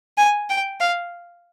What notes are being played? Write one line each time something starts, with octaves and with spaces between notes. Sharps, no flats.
G#5
G5
F5